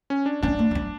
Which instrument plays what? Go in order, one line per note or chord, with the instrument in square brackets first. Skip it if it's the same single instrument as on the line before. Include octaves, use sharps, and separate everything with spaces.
[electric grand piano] C#4
D4
[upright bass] C#4 [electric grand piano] D4
[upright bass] A#3
A#3
C#4